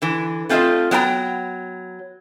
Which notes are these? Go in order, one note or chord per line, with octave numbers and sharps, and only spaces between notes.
D3 E3
A3 C4 F4 F#4 A4 D#5
F#3 B3 G5 A#5